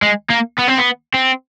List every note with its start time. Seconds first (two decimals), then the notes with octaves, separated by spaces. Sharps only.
0.02 G#3
0.30 A#3
0.58 B3
0.68 C4
0.78 B3
1.14 C4